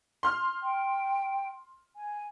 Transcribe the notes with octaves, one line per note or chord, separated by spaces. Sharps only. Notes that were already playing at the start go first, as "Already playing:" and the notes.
C6 F6
G5
G#5